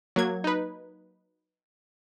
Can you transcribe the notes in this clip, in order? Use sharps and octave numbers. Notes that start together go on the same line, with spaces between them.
F#3 A#3 G#6
D#4 B4